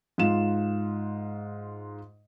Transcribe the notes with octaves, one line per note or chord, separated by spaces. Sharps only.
G#2 F4 E7